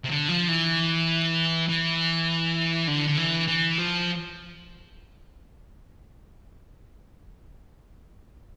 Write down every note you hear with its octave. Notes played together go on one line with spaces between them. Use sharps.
C3
D3
F3
E3
E3
D3
D3
E3
E3
F3